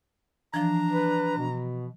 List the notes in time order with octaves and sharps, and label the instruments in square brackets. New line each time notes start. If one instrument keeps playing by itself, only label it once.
[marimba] E3 F3 [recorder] D4 [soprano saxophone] A#5
[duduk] B4
B2